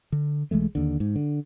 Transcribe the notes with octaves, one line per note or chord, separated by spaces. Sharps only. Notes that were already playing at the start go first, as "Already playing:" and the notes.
D3
B1 E3 G#3 A3
D#2 D3
G#2
D3